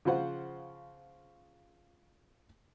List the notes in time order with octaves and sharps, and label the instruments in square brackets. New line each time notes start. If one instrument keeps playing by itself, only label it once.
[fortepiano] C#3 F3 F4 C5 F#5